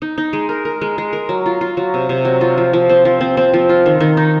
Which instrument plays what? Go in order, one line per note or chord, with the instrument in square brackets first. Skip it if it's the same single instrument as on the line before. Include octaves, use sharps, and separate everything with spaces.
[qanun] D#4
D#4
G#3
A#4
A#4
G#3
G#3
A#4
F#3
F4
F4
F#3
C3
C3
F#3
F4
F3
F3
C4
F3
C4
C4
F3
F4
D#3
D#3
D#4